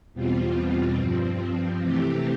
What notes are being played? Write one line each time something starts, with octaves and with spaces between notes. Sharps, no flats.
E2 B2 G3 C4 F4
G2 F3 C4
C3 E3 A3 C4 G4